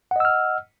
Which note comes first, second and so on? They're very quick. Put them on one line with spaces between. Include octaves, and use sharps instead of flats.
F#5 D#5 E6 F6